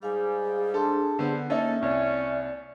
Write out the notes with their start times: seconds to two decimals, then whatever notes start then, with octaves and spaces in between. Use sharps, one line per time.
0.03 G#2 G3 G#4 F5 G#5
0.74 D4 A4 A5 C6
1.19 D3 G3 B3 C4 C5
1.50 A#3 C#4 D#4 A4 E5
1.82 C2 C#4 D5